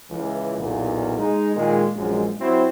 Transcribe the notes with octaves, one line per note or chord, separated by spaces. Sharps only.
C#2 E3
B1 E2 A#2
G#3 D#4
A#2 D#3 G#3
A#1 F#2 G#3
F#3 C4 E4 F#4